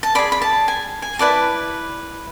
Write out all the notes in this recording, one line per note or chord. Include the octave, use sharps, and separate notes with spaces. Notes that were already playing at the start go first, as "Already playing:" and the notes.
A5
G#4 D5 B5
B5
A5
G#5
G#5
E4 B4 D5 A5